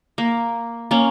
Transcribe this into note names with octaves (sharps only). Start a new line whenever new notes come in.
A#3
A#3 C#4